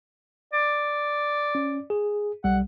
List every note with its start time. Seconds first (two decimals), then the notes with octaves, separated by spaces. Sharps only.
0.53 D5
1.55 C#4
1.90 G#4
2.44 B1 G3 F#5